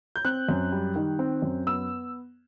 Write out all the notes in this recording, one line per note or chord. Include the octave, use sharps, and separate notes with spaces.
G6
C4 F#6
F#2
G3
D#3
C4
F#2
B3 E6